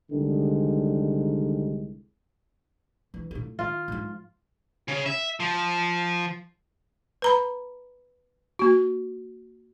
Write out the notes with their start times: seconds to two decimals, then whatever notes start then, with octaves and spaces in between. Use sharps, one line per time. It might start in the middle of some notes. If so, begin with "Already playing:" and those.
0.12 C2 D3 D#3 G#3
3.14 E3
3.31 A2 F4
3.59 D#3 F4
3.88 G#2 F3
4.88 C#3
5.06 E5
5.40 F3
7.22 B4 A#5 B5
8.59 A#3 F#4